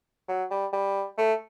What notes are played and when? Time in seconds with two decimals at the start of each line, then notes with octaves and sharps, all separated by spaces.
0.28 F#3
0.51 G3
0.73 G3
1.18 A3